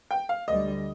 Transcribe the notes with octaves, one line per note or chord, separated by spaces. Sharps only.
G5
F5
D2 D3 G3 D#5